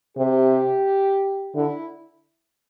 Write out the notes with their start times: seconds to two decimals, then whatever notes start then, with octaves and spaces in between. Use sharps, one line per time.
0.18 C3 G4
1.54 D3 E4